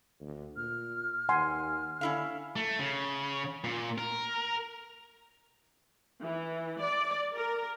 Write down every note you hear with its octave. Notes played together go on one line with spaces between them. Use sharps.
D2
A#2 F6
D#2 F#5 G#5 C6
D3 C#4 E4 F5
A3
C#3
A#2
A#4
E3
D5
A#4